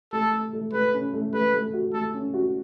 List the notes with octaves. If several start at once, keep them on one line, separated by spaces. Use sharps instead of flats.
A3 A4
A3
A3
A3 B4
C#4
A3
A3 B4
A3
F#4
A3 A4
C#4
F#4